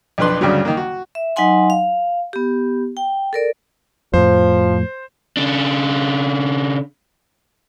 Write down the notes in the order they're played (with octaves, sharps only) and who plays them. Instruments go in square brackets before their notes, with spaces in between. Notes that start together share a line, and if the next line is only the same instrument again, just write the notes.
[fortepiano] B1 F2 D4 B4 C6
D2 G2 C#3 F#3
D#3 A#3
F#4
[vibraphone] E5
F#3 D#4 D#5 F#5 G#5 C6
F5
B3 G4
G5
A4 A#4 D5
[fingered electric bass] F2 A2 [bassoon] F3 [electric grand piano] C5
[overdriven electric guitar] C#3 D4